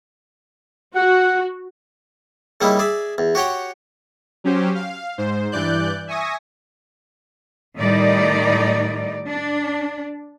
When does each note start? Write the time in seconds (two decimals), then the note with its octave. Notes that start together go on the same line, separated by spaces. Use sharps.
0.96 F#4 F#5
2.61 C#3 G3 A#3 D#4 E4
2.79 G#4 D5 E5
3.18 E2
3.35 F#4 G4 C#5 F#5 G5
4.44 F#3 C#4 G4 C5
4.75 F5
5.18 G#2 C5
5.51 G2 E3 D5 F#6 G6
6.07 E5 G#5 C#6 D#6 A#6
7.77 A2 D#3 G3 D#4 D5
9.28 D4